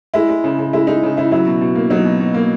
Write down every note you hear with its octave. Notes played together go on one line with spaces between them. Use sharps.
G#3 E4
G#3
C#3
C#3
G#3 E4
G#3 D#4
C#3
C#3 E4
F#3 E4
B2
B2
A#3
F#3 D#4
B2
B2
A#3